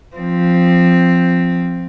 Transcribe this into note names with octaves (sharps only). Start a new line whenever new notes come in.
F3 C4